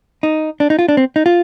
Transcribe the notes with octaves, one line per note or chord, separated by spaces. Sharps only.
D#4
D4
D#4
F4
D4
C4
D#4
F4